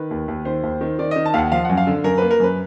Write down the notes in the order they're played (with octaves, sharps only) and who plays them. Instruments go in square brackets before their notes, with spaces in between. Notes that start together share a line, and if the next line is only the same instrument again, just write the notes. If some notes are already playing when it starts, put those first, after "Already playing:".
Already playing: [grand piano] D#3 B4
D#2
D#2
D#3 C5
D#2
D#3
D#3 D5
D#3 D#5
A5
D#2 F5 F#5
F3 F5
F#2 F#5
F5
D3
F#2 A#4
A#3 B4
A#4
F#2 B4